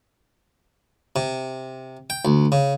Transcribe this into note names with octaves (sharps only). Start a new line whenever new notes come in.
C3
G5
D2
C#3